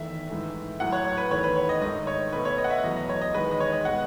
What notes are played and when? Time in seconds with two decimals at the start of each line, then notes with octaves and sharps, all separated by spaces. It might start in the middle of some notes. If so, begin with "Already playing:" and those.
Already playing: E2 D#3 A3 E5
0.30 G#2 E3 A3
0.80 A2 F#3 A3 F#5
0.92 C#5
1.05 C#5
1.18 B4
1.31 E2 D#3 A3 C#5
1.44 B4
1.56 C#5
1.69 D#5
1.81 G#2 D#3 A3 D#5
2.07 C#5
2.33 B2 A3 B4
2.45 C#5
2.58 D#5
2.64 F#5
2.71 E5
2.83 E2 B2 F#3 A3 D#5
2.96 D#5
3.09 C#5
3.21 D#5
3.34 E2 D#3 G#3 B4
3.51 D#5
3.60 C#5
3.72 D#5
3.85 B2 G#3 F#5